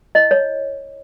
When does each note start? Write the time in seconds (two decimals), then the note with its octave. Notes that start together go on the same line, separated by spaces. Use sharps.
0.15 E4 D#5
0.31 C#5